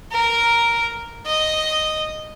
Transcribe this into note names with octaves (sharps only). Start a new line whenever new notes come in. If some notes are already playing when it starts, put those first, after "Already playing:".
A#4
D#5